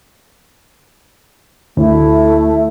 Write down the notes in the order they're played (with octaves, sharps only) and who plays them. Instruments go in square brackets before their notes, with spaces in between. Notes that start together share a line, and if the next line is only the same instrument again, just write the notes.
[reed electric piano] D2 [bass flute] A3 [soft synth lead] E4